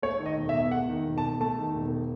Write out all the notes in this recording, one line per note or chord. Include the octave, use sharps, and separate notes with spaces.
A3 C#5
D#3
D#5
E1
E5
E2
A3 F#5
D#3
E1
A5
E2
A3 A5
D#3
E1